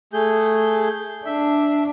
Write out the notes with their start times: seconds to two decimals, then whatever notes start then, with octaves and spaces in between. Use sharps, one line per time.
0.13 A3 G#4 G6
1.25 D4 E5